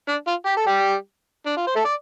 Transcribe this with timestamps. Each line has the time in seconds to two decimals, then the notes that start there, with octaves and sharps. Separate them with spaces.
0.08 D4
0.27 F4
0.46 G4
0.57 A4
0.67 G3 G4
1.46 D4
1.57 F4
1.67 C5
1.75 A3 A4
1.85 D5